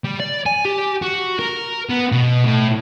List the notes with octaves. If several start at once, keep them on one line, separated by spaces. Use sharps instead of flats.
G3
D5
G#5
G4
F#4
A#4
B3
B2
A2